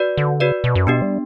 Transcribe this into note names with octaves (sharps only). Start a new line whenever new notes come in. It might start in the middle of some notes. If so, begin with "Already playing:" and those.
Already playing: F#4 B4 D5
D3
C#3 F#4 B4 D5
B2
F#2
B2 B3 D4 G4
G3